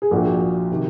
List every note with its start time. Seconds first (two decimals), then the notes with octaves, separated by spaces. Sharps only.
0.02 G#4
0.11 A#1 A#2 F3 F#4
0.72 C3 D#3